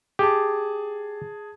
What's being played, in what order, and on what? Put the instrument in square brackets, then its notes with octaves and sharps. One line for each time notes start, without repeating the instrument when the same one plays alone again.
[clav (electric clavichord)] G4 [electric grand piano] G#4 A5